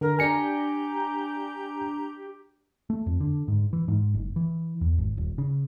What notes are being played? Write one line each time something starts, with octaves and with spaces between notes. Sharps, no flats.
D3 A#4
D4 G4 G#5 A#5 C#7
A3
F2
D3
G#2
E3
G#2
F#1
E3
E2
G#1
D#1
C#3